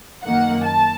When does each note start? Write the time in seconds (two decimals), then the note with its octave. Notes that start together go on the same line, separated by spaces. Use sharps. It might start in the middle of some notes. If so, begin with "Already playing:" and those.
0.24 F#2 D#3 A#3 F#5
0.65 A5